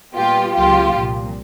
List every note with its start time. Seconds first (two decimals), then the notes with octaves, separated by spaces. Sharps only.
0.14 A#2 G3 B3 F4 G4
0.54 C#2 C#3 F#3 A#3 F4 G4
0.95 C2 A#2 F3